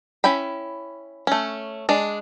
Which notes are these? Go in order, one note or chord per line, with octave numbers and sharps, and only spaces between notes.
C#4 E4 G5 B5
A3 C#4
G#3 D4